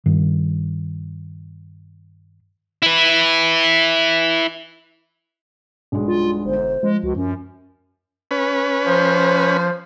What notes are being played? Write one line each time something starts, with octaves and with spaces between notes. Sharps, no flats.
G2 D#3
E4 B4
B1 G2 G#3
F4
G1 C5
F3 G#3
C#2 F#4
F#2 C#4
C#4 B4
F3 C5